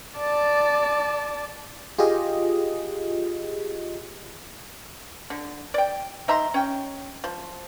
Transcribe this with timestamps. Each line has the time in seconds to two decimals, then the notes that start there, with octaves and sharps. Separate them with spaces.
0.18 D5 A5
1.98 F4 G4 G#4 D#5
5.30 D3
5.74 D5 G5
6.28 D#4 E5 A#5 C6
6.54 C#4 G5
7.24 F3